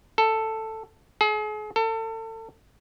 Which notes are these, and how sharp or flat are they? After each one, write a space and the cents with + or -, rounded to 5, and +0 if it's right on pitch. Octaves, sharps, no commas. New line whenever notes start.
A4 +10
G#4 +40
A4 +35